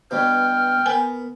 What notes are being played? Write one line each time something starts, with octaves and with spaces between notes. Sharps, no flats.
G2 B2 G5 F6
B3 A#4 G#5